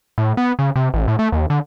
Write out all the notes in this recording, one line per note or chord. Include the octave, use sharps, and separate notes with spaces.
A2
B3
C#3
C3
A1
A2
A3
D#2
D3